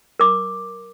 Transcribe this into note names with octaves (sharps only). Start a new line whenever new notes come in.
A#4 D6